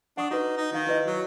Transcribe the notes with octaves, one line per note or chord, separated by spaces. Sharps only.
D4 F#5 C#6 D#6
D#4 F#4 B4
D#4
D#3 D#4 F5
E4 B4 D#5
F#3